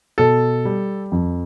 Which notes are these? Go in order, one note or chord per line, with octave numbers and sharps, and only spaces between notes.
B2 A4
G3
F2